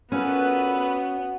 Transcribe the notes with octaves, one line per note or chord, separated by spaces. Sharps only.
A#2 B3 C#4 F#4 A4 B4